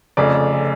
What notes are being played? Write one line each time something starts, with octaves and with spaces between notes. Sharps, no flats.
F1 F2 C#3 D5